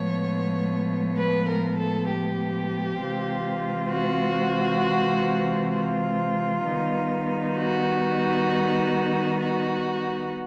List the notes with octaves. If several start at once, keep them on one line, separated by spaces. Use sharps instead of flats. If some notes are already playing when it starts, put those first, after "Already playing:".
Already playing: A2 F3 G#3 B3 C#5
B4
A#4
A4
G4
C3 E3 G#3 C4 F4
F#4
F4
D#3 G3 B3 D#4
F#4
F#4